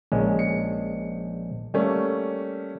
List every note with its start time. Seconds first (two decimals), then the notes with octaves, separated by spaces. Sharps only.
0.12 A#1 G#3 C#4
0.39 C#7
1.74 G3 A3 A#3 C#4